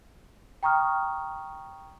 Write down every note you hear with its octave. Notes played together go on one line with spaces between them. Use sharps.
G5 A#5 C#6 D#6 F6